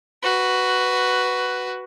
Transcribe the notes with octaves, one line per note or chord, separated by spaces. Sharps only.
F#4 B4